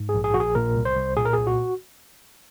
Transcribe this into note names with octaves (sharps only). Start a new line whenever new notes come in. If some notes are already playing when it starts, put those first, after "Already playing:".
Already playing: G#2
G#4
A#1
G#4
A#1 F#4
G#4
A#2 A#4
C2
C5
C2
A#2 G#4
A#4
C2 G#4
F#4